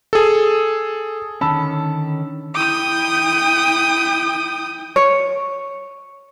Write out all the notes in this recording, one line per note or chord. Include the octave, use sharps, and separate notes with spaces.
G#4 A4
D3 D#3 C#4 A5 B5 E6
E4 G5 D#6
C#5